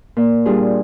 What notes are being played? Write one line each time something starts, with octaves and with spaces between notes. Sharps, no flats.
A#2
G3 D4 F4 G#4